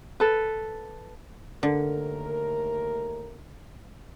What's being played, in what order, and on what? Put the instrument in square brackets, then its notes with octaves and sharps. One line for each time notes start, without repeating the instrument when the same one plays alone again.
[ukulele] A4 B4
[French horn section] D#2 A3 A#4 [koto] D3